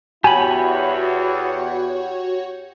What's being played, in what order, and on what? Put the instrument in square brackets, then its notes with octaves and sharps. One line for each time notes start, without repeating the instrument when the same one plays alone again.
[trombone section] E2 E4 [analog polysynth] F#4 C#5 [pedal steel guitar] G4 B5 [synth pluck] G#5